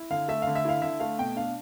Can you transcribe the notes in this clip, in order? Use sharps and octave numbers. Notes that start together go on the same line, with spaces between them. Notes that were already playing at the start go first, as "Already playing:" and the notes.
Already playing: E4
D3 F5
A3 E5
F5
D3
E5
E4 F5
D3 E5
A3 F5
B2 G5
D4 F5